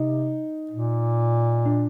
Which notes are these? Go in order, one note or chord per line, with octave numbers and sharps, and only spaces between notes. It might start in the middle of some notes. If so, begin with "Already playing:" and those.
Already playing: C3 D#4
A#2
D4